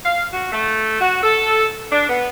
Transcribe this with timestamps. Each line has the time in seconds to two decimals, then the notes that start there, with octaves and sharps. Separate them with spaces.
0.05 F5
0.33 F#4
0.52 A3
1.01 F#4
1.23 A4
1.92 D4
2.08 B3